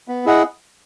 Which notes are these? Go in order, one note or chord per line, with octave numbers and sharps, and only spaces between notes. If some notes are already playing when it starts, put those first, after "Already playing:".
B3
E4 G#4 D#5 F#5